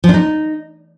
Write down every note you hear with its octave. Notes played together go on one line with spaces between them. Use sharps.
F3
D4
D#4